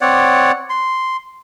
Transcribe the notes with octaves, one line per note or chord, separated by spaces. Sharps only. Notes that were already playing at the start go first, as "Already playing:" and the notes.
C4 C#5 D5 F#5
C6